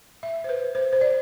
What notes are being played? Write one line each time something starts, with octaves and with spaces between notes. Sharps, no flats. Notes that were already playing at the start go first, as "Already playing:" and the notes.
E5
C5
B4
C5
C5
D5